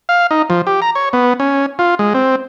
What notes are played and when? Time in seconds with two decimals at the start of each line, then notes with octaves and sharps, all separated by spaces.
0.09 F5
0.31 D#4
0.50 F3
0.67 G4
0.82 A#5
0.95 C#5
1.13 B3
1.40 C#4
1.79 F4
1.99 G#3
2.14 C4